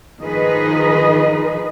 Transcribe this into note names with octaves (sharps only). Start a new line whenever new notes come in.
D#3 F3 D#4 G#4 B4 D#5